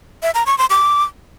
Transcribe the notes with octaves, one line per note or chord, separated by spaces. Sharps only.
E5
A#5
C#6
C6
D6